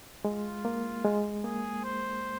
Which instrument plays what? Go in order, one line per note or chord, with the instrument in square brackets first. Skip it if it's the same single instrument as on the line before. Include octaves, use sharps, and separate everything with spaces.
[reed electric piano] G#3 [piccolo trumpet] F4
[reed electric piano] A#3
G#3
[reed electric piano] A#3 [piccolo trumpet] G#4
[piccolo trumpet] C5